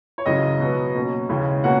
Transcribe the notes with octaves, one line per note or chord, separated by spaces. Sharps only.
C#5
F#2 C#3 E3 G#3 C#4 D#5
B2 F#3 B3
B2 A#3 C#4
D#2 C#3 E3 G#3 C#4
B2 A#3 C#4 F#5